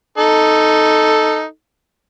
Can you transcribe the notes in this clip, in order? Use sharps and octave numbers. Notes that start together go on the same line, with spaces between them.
D#4 A4